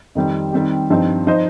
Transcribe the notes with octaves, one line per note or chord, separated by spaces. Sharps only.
F2 D#3 G3 C4
D#3 G3 C4 G4
G2 F3 C4 D#4
F3 D#4 C5 D#5